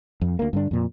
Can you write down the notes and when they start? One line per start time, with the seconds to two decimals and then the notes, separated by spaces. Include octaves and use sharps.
0.22 F2
0.39 D2 A#3
0.53 G2 D3 D4
0.71 F2 A#2